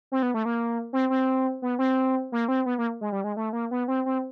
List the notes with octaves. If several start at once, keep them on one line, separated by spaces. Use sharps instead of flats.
C4
B3
A3
A#3
C4
C4
B3
C4
A#3
C4
B3
A#3
G#3
G3
G#3
A3
A#3
B3
C4
C4